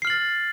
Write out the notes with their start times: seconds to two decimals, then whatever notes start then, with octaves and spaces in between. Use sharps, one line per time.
0.02 C7
0.05 F6
0.07 F#7
0.10 A6